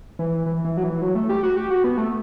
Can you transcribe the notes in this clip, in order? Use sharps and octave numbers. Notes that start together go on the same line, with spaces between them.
E3
E3
E3
F#3
E3
F#3
A3
G4
F#4
G4
F#4
B3
A3